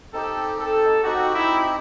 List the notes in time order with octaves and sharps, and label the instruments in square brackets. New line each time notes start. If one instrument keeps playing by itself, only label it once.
[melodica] C4 D#4 G4 [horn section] A4
[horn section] A4
[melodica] C4 D#4 G4 [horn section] F#4
[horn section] E4